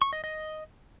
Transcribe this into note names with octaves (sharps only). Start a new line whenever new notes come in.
C#6
D#5
D#5